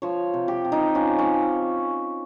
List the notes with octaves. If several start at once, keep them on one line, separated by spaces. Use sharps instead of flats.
F3 C#5
C3
G4
C3
D#4
F3 C#4
C#4